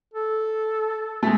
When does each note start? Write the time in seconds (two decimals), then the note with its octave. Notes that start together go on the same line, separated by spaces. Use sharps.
0.14 A4
1.23 G#3 A3